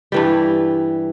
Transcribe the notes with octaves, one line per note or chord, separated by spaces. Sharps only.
G2 E3 G3